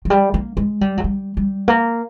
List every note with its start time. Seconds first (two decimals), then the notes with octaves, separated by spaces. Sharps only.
0.05 F#3
0.10 G3
0.34 A#3
0.57 G#3
0.81 G3
0.97 F#3
1.04 G3
1.37 G3
1.68 A#3